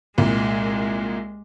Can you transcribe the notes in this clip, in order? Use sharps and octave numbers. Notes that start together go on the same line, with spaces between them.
C2 A#2 G#3